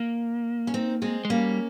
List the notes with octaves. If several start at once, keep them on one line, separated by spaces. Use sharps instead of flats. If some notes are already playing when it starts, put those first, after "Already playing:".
Already playing: A#3
C#4
C4 D#4
G#3 C4
G#3
G3 A#3 C#4